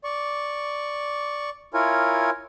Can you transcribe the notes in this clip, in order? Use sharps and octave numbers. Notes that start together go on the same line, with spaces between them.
D5 C#6
E4 F4 A#4 C#5 G#5